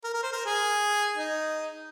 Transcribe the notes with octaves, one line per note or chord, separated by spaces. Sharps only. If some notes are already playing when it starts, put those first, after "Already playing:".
A#4
A#4
C5
A#4
G#4
D#4